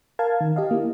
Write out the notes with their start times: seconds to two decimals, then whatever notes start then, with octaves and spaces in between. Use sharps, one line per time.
0.19 A#4 F5 A5 G#6
0.41 D#3
0.56 G4 D#5 F5
0.71 A#3 E4